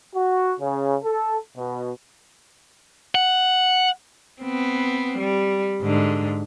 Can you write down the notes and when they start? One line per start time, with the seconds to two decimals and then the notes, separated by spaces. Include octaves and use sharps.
0.15 F#4
0.60 C#3
1.04 A4
1.57 B2
3.15 F#5
4.42 B3 C4
5.18 G3
5.82 G#2 D3